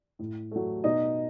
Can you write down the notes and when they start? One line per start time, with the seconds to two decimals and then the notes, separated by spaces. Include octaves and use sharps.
0.19 A2
0.51 F#3 A3
0.84 B2 D#4 D#5